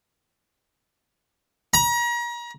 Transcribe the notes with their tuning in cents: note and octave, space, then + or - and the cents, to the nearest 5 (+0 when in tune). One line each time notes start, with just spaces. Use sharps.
A#5 +35